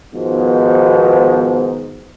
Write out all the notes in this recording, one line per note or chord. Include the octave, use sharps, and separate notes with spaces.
G#2 B2 D#3 F3 B3